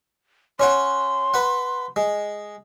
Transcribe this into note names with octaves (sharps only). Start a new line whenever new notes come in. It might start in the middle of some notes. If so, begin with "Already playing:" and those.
C#4 C#5 F#5 C6
B4 F#5
G#3